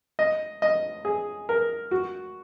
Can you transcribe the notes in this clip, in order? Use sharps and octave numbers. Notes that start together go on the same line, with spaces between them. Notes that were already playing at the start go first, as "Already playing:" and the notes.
D#5
D#5
G#4
A#4
F#4